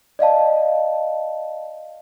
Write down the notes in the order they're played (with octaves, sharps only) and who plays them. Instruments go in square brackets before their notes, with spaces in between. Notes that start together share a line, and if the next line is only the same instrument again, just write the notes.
[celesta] D5 D#5 F5 A5